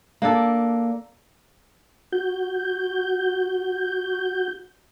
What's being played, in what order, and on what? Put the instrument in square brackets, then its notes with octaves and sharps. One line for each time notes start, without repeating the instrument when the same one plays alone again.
[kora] A#3 D4 A4
[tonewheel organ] F#4 G6